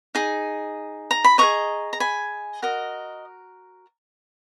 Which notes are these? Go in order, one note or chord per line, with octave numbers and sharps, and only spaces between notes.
D#4 G#4
A#5
B5
G#4 B4 D#5 A#5 C#6
A#5
G#5 B5
F#4 A#4 D#5